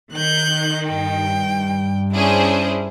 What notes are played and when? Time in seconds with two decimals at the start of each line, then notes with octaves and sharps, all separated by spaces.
0.14 D#3 F#6 G6
0.85 G2 G5
2.14 C#4 D4 E4 G#4 C5